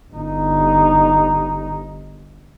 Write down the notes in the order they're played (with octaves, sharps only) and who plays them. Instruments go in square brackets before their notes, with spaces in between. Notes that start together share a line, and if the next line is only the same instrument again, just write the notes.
[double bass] G1 D#4